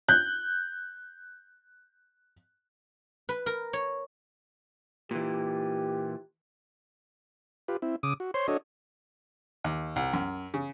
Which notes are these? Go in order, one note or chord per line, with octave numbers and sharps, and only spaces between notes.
F#6 G6
B4
A#4
C#5
A#2 E3 G4
F4 G4 B4
C4 E4
C#3 D6 D#6
F#4
C5 C#5 C6
D4 F#4 A4 C#5 D#5
D#2
C2
F#2
C#3